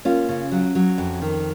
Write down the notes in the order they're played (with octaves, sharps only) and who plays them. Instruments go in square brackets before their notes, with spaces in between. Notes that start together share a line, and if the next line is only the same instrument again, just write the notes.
[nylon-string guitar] A#3 C#4 F4
C#3
F#3
F#3
F2
D#3